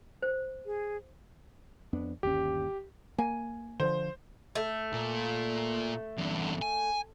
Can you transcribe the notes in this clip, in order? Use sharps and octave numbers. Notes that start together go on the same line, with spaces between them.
C5
G#4
F2 B3 D4
G1 D#2 C#4 G4
A#3 G#5
D3 F3 C5
A3
A#2
E2 G2
G#5